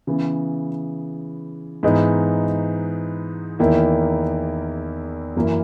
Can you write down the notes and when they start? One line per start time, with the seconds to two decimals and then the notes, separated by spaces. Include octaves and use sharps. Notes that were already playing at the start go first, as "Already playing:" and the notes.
0.07 C#3 E3 B3
1.83 G#2 E3 B3 D#4
3.59 E2 D#3 A#3 E4
5.36 F#2 E3 A#3 C#4 E4